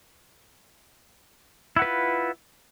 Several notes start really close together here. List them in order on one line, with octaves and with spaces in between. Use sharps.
E4 F#5 B4 F4